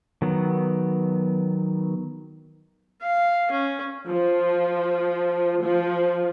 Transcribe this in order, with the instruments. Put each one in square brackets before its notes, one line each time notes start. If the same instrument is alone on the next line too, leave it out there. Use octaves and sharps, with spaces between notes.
[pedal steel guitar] D#3 F#3 B3
[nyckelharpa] F5
C#4
[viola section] F3
F3